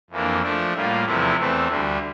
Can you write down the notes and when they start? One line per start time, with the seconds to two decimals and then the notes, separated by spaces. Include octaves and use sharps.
0.10 F2 E3 A#3 D4
0.42 F3 A3 D4
0.74 A2 G3 A#3 F4
1.05 E2 C3 F3 A3 E4
1.36 E2 E3 A3 C4
1.67 D2 D3 G3